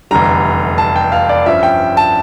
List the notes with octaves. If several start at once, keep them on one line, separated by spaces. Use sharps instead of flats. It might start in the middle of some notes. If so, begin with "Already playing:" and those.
F1 E2 D3 G3 A#5
A5
G5
F5
D5
G2 F3 C#4 E5
G5
A5